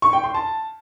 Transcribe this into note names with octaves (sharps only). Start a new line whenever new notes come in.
C#6
G5
C6
A5